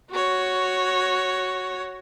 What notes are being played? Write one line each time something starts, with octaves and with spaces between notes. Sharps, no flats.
F#4 C#5